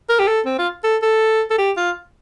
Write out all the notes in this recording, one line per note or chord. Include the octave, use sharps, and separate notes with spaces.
A#4
G4
A4
C4
F4
A4
A4
A4
G4
F4